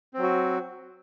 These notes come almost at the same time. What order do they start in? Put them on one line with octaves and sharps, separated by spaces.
C4 F#3 F#4